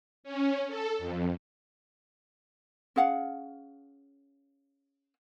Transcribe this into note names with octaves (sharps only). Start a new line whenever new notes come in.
C#4
A4
F2
C#4 G#4 F5 F#5